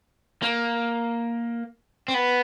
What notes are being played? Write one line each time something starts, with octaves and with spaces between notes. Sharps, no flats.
A#3
C4
B3